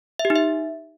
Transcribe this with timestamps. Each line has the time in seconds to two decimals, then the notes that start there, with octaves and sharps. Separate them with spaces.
0.19 E5
0.25 G4
0.30 D#4
0.35 E5